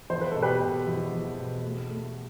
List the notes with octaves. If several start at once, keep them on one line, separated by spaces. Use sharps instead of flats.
E2 C5
B4
B2 A4
G4 B4
B2
E2
E2
B2
A3
A3